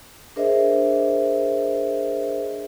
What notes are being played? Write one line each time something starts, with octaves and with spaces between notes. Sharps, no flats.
D4 G#4 A#4 C5 D#5 E5